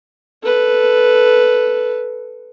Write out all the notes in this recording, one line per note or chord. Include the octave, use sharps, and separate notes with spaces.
A4 B4